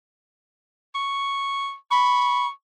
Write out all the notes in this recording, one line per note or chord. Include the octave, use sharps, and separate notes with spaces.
C#6
B5 C#6